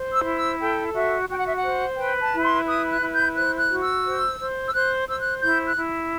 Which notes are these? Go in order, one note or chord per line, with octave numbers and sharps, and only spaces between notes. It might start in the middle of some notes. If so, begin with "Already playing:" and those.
Already playing: C5
E6
E4
E6
A4 G5
F#4 E5
F#4 G5
F#5
E5
F#5
C5
B4 G5
A5
E4
C6
B4 D#6
F#6
E4
G6
C5 F#6
F#6
F#4
E6
C5
C5
E6
C5 F#6
C5 E6
F#6
E4 G6
F#6
E4